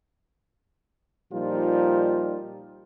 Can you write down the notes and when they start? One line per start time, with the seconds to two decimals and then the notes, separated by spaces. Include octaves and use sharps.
1.32 A#2 F3 G3 D#4 F4